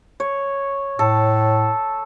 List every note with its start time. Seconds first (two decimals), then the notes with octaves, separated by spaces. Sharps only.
0.20 C#5
0.99 A2 A4